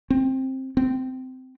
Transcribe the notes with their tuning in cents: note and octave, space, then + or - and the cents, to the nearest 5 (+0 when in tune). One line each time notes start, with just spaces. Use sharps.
C4 +15
C4 -20